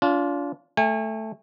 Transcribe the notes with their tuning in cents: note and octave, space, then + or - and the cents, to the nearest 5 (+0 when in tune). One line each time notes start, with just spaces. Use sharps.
D4 -40 F4 +0
A3 +0 G#5 -45